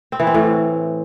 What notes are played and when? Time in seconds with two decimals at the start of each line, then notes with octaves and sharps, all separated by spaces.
0.12 C4
0.20 E3
0.27 C4
0.34 A2